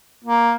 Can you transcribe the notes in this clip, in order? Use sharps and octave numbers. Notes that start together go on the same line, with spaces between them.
A#3